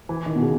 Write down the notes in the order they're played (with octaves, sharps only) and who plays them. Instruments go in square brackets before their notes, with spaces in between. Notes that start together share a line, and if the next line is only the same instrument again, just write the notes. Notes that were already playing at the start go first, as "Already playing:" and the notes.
[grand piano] E3
D#3
B2
C#3